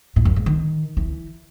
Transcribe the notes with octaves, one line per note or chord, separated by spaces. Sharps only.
A2
F#2
G#2
D#3
E3